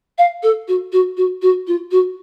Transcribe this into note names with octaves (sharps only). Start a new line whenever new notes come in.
F5
A4
F#4
F#4
F#4
F#4
F4
F#4